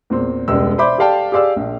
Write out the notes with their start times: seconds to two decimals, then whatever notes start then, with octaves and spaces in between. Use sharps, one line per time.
0.10 E2 A#2 C4
0.48 E1 C#2 G3 G#3 E6
0.78 C5 D5 E5 B5 D6 G6
0.98 G4 A4 D5 F5 G5 A5
1.32 G4 G#4 D5 F5 E6
1.56 A#1